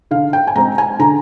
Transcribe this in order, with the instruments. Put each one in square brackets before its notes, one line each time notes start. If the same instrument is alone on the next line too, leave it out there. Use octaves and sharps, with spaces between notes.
[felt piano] D3 F5
G5
G#5
G#3 C4 A#5
G#5
D3 A#5